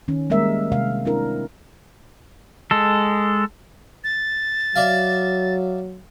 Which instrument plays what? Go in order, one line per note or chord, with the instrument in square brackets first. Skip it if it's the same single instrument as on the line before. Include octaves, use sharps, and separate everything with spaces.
[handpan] D#3 C#4
G3 G#3 A#3 A#4 E5
C3 G#3 F5
C4 D4 E4 A#4
[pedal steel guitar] G#3 A4
[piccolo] A6
[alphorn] F#3 [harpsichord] D5 E5 F5